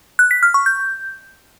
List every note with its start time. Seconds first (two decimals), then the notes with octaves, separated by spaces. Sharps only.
0.19 F#6
0.31 B6
0.43 F6
0.54 C#6
0.66 G6